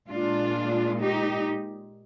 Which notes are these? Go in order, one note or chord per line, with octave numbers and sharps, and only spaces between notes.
A#2 G#3 D4 F4
D#4 G4